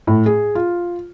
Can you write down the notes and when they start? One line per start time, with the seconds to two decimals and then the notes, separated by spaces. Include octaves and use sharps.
0.07 A2
0.26 G#4
0.55 F4